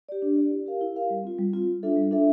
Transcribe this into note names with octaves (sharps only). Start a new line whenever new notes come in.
G4 D5
D4
G4 D5
E4
G4 A#4 F5
E4
G4 A#4 F5
G3
C4 F4
G3
C4 F4
G3
D4 F4 A4 E5
G3
D4 F4 A4 E5